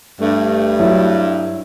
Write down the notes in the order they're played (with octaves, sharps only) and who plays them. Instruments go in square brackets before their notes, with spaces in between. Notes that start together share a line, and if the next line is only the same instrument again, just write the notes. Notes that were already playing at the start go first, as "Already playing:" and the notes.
[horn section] G2 [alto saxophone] A3
[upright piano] F#3 E4